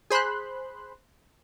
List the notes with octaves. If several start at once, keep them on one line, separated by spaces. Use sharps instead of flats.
G#4 C5 B5 C6 F#6